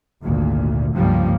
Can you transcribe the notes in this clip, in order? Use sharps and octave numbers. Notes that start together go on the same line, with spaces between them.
G#1 D2 A#2
C#2 G2 F3 G3 A#3